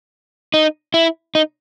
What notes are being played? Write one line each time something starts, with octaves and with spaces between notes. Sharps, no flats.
D#4
E4
D#4